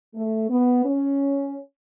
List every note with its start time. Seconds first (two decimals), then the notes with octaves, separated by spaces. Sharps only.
0.15 A3
0.50 B3
0.85 C#4